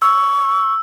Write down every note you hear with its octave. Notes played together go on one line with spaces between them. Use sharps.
C#6 E6